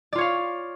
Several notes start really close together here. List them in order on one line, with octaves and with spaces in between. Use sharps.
D5 F4 C#5 F5